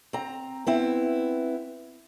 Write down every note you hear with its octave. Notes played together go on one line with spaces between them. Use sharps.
C4 A#5
B3 C4 E4